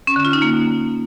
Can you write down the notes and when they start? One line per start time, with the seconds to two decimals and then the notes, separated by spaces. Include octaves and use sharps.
0.07 C#4
0.16 D3
0.25 F4
0.33 D#4
0.42 A#3